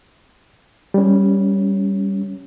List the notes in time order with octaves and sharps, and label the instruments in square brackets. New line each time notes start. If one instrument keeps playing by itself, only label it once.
[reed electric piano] G3 C#4